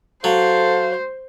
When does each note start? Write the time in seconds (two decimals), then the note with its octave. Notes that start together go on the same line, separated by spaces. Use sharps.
0.24 F#3 A4 C5 F5